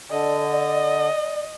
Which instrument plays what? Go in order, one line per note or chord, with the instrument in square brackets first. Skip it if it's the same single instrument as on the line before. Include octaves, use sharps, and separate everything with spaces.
[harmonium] D3 [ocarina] D5 [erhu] D#5